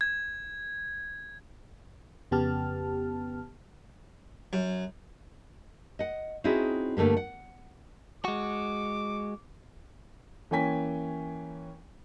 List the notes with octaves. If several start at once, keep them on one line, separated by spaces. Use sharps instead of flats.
G#6
F2 C#3 B3 G4 A5 F6
F#2
D#5 F#5
C4 C#4 D#4 E4 F#4 G#4
G2 D3 A3 A#3 G4
F#5
G#3 F#4 D6
E3 A#3 C#4 G5 G#5 B6